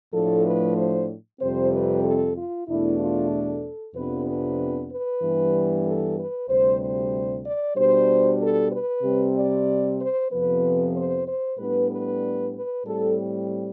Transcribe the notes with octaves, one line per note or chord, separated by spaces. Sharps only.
A2 F3 A3 D4 A4
B4
C5
F2 C3 G3 C4 C5
B4
A4
F4
E2 B2 A3 D4 E4
F4
A4
F2 C3 F3 B3 D4 B4
B4
B4
G2 E3 G3 B3
A4
B4
D2 C3 G3 C5
C5
D5
B2 G3 D4 C5
A4
B4
C3 G3 C4
D5
C5
F2 C3 F3 B3 B4
C5
C5
A2 G3 B3 D4 B4
B4
B4
A2 G3 C4 A4